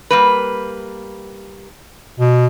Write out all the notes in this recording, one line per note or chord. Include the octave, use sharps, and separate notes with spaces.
G3 A#3 B4
B2